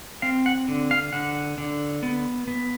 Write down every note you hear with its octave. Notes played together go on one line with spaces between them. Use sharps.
C4 F5
F#5
D3
F5
D3 F#5
D3
B3
B3